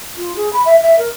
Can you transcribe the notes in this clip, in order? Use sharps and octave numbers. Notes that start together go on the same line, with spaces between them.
F4
G#4
B5
E5
E5
A#4